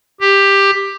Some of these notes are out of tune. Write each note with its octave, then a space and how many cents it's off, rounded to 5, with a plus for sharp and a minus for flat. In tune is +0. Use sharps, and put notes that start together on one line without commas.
G4 +10